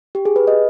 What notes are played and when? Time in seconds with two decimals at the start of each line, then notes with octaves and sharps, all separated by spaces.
0.15 G4
0.25 G#4
0.36 B4
0.47 D#5